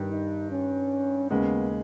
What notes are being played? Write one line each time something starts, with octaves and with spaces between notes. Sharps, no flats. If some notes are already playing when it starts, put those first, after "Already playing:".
Already playing: G2 D#3 G3
D#4
C#4
D#2 C#3 G#3 B3